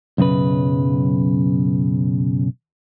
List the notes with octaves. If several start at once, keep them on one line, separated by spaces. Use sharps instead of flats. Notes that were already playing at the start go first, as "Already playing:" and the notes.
B1 F#2 C#3 B4